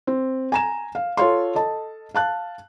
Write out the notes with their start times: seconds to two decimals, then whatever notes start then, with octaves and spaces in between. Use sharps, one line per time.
0.07 C4
0.52 G#5 A#5 E7
0.95 F5
1.17 F4 A4 C#5 F5 C6
1.55 A4 D#5 A5
2.15 F5 A5 F#6